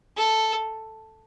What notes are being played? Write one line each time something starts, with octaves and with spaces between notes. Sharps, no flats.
A4